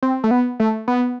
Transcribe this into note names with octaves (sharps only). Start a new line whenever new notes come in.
C4
A3
B3
A3
B3